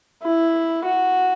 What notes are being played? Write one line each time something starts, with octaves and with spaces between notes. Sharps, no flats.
E4
F#4